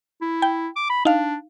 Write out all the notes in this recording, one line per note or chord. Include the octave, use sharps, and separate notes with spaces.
E4
G5
D6
B5
D4 D#4 F5